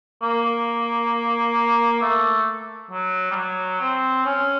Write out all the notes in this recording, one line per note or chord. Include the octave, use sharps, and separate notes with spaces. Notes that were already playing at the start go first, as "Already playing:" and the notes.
A#3
A3
F#3
G3
F#3
C4
C#4